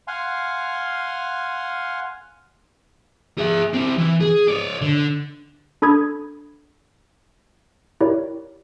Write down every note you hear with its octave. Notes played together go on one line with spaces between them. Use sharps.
F5 F#5 G#5 C6
G#4 E5
C4 E4
E3
G#4
C#5 D5
D3
D4 A4 B5 D#6 G#6
E4 G4 A#4 C#5 D5